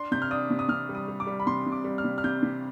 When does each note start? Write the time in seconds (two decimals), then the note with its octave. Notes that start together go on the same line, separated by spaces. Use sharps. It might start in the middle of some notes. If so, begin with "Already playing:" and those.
Already playing: D4 C6
0.12 C3 G6
0.22 F6
0.31 D4 D#6
0.50 C3
0.59 D#6
0.69 C3 F6
0.89 G3
0.95 D#6
1.08 G3
1.20 D6
1.27 G3
1.40 B5
1.47 C3 C6
1.66 C3
1.72 D6
1.84 G3
1.98 F6
2.04 C3
2.18 F6
2.24 C3 G6
2.43 C3